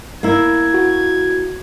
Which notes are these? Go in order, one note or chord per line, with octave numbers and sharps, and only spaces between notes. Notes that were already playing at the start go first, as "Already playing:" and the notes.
A#3 E4 G#6
F#4